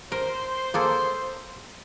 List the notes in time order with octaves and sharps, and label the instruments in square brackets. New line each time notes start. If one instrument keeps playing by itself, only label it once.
[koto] A#4 [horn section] C5
[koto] A#3 G#4 A4